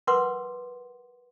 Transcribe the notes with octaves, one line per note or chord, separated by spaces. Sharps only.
A#4 B4 F#5 C6 D6